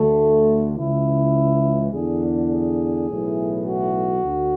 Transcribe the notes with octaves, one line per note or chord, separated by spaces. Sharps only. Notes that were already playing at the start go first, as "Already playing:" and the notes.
Already playing: D2 D3 A3
C#2 C#3 E3 E4
E2 D3 G#4
G#4
B1 A2 E3
F#4
D2